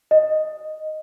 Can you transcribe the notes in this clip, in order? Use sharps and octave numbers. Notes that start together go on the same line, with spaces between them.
D#5